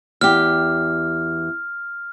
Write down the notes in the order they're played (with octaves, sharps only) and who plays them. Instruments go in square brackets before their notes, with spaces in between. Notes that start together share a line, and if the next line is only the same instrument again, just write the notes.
[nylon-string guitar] E2 G4 [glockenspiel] F6